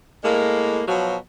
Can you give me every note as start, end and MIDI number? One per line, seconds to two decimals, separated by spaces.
0.24 0.83 45
0.24 0.83 56
0.24 0.83 58
0.88 1.16 47
0.88 1.16 53
0.88 1.16 54